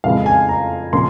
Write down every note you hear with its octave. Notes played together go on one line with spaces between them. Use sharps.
F2 C#3 E3 G#3 F5
G#5
A#5
C#3 F3 A#3 C#4 C6